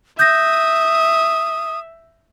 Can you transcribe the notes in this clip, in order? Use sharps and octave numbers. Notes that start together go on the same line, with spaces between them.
E5 D#6 G6 A#6